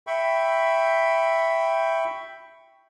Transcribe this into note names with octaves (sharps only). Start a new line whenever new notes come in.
E5 G5 B5 C#6